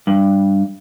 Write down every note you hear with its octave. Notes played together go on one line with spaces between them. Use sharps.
G2